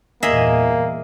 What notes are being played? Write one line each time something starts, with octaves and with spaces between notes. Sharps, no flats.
E2 G2 A#2 A#3 G#4 D#5 E5